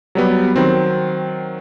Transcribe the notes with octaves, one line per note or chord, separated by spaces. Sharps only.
F#3 G3 B3
D#3 F#3 C4